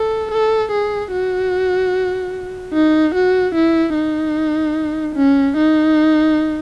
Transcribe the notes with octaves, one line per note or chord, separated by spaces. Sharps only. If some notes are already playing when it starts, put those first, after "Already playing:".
Already playing: A4
A4
G#4
F#4
D#4
F#4
E4
D#4
C#4
D#4